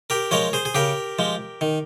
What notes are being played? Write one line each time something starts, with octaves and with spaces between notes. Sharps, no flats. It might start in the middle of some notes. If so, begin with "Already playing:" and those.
G4 A#4
F3 G#3 A#4 C#5
G#4 C5
G#4
C#3 G4 A#4
F3 G#3
D#3